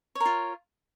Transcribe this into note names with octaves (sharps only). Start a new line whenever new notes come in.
F4 A#4 C#5